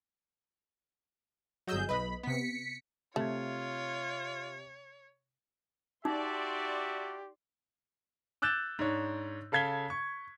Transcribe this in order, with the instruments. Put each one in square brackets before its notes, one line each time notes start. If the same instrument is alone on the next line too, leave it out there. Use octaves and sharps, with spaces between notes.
[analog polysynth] G1 G#4 G6 [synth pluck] F#3 D#5 E6
[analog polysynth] B1 B5 [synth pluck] B4 D#5
[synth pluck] C3 B3 [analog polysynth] B6 C#7
[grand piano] C3 G#6 [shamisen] A3 [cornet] F4 [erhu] C#5
[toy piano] D#4 [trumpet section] F#4 E5 A5 [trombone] G4 [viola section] D5 C6
[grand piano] D6 E6 F#6 G6 A6 E7
G#2 D4 C#5
C#3 A4 F5 G#6 B6 G7
C#6